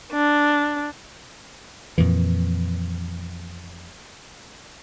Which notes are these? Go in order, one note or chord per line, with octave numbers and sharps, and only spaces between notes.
D4
F2 A#2 E3